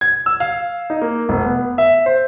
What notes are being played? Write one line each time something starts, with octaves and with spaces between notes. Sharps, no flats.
G#6
E6
F5
D#4
A#3
F1
B3
E5
C5